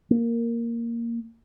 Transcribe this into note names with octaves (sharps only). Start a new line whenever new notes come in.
A#3